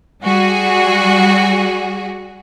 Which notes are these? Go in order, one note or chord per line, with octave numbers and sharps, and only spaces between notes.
G3 F#4 G#4